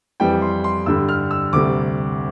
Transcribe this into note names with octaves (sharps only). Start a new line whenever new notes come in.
F2 E3 G3 G5
C6
C6
G2 D3 G3 E6
F6
E6
D2 C3 G3 D6